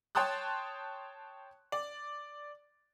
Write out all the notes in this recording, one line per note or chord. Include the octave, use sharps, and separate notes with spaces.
C#5 G5 A5 C6 D#6 F#6
D5